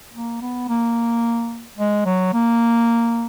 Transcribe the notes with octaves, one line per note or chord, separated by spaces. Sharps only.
A#3
B3
A#3
G#3
F#3
A#3